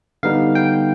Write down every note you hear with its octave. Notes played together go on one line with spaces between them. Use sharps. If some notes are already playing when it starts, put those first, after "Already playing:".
D3 G3 B3 D#4 F5
G5